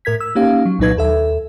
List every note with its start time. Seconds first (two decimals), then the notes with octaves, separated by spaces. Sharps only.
0.05 A2 A#4 G#6 B6
0.20 E6
0.35 A#3 C#4 D#4 G4 F5
0.66 F#3
0.79 C2 A#2 F#3 D#4 B4 G#6
0.97 D#2 A4 E5